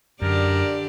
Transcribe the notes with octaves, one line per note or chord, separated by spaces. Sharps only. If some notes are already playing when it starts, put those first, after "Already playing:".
F#2 D3 G4 A#4 D5